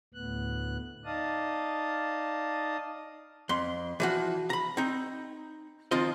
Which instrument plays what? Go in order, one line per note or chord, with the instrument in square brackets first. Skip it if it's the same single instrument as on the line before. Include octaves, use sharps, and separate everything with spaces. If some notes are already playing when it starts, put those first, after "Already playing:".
[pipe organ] D2 A2 B3 F#6
D#4 D5 D#5 F5 A5 D#6
[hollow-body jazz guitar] F2 C6
E3 F3 F#4
A#5 B5
C4 D#4
D#3 F3 C4 F4 D#5